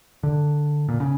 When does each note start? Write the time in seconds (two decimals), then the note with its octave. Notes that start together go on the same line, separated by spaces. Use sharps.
0.23 D3
0.89 A#2
1.00 C#3